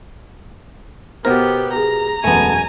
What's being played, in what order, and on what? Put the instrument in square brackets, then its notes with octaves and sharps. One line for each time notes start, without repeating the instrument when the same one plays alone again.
[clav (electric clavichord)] B2 A#4 [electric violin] B3 G4 [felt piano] C5
[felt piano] G4 G#4 [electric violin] A#5
[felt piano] E1 F#2 [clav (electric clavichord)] A3 B3 [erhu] G#5